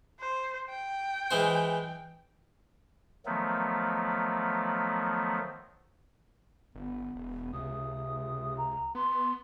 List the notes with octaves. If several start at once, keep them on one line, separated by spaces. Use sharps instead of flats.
C5
G5
E3 G#3 C5
D#3 F3 F#3 A3 B3
G1 B3
E1
C#2 C3 D#6
A#5
B3 C6